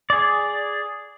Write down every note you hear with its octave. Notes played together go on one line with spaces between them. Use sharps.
G#4 D5